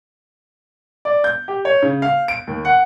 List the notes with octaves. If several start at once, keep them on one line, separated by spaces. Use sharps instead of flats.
D5
G6
G4
C#5
C#3
F5
D7
D#2
F#5